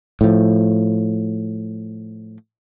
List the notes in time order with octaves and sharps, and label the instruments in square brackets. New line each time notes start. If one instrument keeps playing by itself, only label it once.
[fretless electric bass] A2 F3